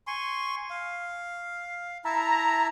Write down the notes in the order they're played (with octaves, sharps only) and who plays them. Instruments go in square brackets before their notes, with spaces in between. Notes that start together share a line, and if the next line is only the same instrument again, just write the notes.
[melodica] G#5 C6 C#6
F5
[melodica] E4 E5 A5 [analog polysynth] A#5